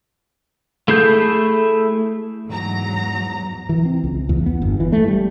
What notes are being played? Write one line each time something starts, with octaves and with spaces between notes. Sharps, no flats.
A3 E4 G#4 A4 G6
E2 G#2 F#3 A#5
E3
C4
C#2
E2
B3
G1
E3
A3
G3